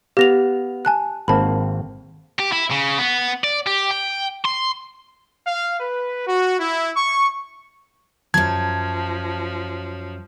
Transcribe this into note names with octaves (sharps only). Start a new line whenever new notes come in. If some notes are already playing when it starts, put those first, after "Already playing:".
B3 G4 F5 A#6 F7
G#5 A5 F#6
G#1 A#3 C4 A5 B5
G4
E4
C#3
B3
D5
G4
G5
C6
F5
B4
F#4
E4
C#6
F#2 F3 F#3 A5 G#6